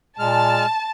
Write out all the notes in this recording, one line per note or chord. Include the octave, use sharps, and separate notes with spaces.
A#2 G#3 A5 F6